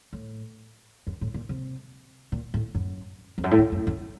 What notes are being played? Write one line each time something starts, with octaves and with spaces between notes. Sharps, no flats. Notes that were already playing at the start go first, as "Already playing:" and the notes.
A2
F#2
A2
A#2
C3
A#2
A2
F#2
F2
F#2
A2
A#2
F#2
F#2